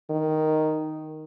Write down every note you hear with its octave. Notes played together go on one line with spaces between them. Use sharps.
D#3